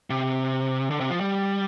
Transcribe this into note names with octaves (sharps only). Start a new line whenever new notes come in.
C3
D3
C3
F3
G3